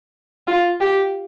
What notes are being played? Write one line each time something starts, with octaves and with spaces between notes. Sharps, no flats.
F4
G4